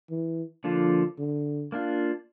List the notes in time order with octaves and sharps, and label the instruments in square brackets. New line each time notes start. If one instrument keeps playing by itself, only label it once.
[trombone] E3
[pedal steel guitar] D3 F3 A#3 D4 F4
[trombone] D3
[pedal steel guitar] A#3 D4 F4